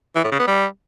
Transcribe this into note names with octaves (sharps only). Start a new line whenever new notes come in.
E3
A2
C#3
B3
G3